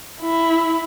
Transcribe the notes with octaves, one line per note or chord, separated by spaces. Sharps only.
E4